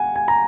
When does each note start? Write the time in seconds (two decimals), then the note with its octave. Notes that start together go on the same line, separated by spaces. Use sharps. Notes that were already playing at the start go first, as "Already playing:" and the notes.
Already playing: F#5 G#5
0.16 G#5
0.28 A#5